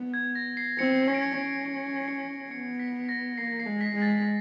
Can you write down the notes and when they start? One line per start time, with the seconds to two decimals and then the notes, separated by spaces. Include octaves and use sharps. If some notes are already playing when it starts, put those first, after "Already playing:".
Already playing: B3
0.14 G#6
0.35 A#6
0.57 C7
0.78 C4 C#7
1.07 C#4
1.14 D7
1.22 C#7
1.36 C#4
1.65 D7
2.08 C#7
2.51 B3 C#7
2.79 B6
3.09 A#6
3.38 A#3 C7
3.60 C7
3.66 G#3
3.81 B6
3.95 G#3
4.02 A6